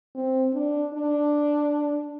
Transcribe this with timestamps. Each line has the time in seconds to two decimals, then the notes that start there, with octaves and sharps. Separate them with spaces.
0.15 C4
0.54 D4
0.94 D4